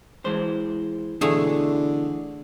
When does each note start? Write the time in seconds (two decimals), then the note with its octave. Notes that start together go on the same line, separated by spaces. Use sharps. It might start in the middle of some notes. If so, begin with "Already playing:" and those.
0.25 E3 G#3 C5
1.21 B2 D3 E3 A3 G#4 C#5